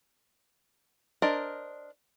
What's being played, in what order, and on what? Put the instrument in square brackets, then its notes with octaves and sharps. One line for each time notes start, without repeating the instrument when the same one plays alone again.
[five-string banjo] D4 A#4 C5 D#5